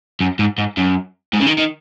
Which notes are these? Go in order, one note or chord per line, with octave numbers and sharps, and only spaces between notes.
F#2
G#2
G#2
F#2
G#2
C#3
D#3
D#3